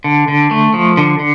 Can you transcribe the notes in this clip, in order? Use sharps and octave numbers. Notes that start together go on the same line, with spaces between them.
D3
D3
A3
F3
D3
D3